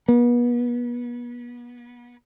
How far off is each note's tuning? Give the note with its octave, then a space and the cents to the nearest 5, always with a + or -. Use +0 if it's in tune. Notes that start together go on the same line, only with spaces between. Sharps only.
B3 -35